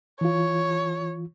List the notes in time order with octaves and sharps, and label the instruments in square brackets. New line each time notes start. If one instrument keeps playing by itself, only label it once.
[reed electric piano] E3 F4 [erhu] C#5